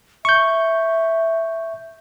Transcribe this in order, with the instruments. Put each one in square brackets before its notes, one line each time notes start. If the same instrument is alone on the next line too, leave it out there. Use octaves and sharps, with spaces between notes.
[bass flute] E5 [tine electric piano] C#6 G6